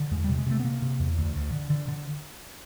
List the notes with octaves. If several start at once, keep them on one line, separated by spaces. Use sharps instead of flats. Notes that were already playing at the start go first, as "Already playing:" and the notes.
Already playing: D3
E2 G#3
G3
C3
G#3
C3 A3
B3
C3 A#3
C3
E2
D2
D2
D3
D3
D3